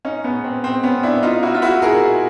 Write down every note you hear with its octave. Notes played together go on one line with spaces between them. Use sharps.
C#4 D#4
B3 C#4
C4
C4
B3 C#4
D4 E4
D#4 F4
E4 F#4
F4
E4 F#4
G#4 A#4